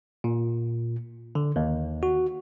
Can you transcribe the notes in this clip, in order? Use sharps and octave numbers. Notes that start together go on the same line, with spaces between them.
A#2
D3
D#2
F#4